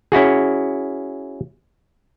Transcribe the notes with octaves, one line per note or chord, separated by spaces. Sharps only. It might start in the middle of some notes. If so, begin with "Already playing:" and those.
C#4 E4 F#4 G#4